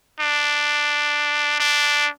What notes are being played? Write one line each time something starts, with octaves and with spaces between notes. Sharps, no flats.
D4
D4